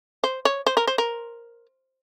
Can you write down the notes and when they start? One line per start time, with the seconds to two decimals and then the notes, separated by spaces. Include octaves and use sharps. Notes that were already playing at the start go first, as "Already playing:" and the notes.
0.24 C5
0.45 C#5
0.67 C5
0.77 A#4
0.87 C5
0.98 A#4